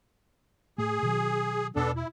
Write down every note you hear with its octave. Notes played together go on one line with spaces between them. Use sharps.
A2 A3 G#4
B2 D#3 F#3
E2 B2 B3 D4 A4
E4